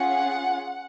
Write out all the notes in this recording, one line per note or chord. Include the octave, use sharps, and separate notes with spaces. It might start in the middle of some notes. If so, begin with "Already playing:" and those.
Already playing: C#4 F4 G#4 F#5